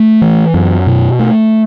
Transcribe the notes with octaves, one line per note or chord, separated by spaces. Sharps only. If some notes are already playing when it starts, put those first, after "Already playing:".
Already playing: A3
E3
F#2
B2
A3